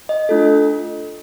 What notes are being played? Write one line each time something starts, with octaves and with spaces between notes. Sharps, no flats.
D#5
A3 D4 F4 A4